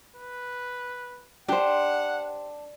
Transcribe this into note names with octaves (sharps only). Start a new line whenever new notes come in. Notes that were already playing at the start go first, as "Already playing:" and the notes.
B4
D4 G4 C5 F#5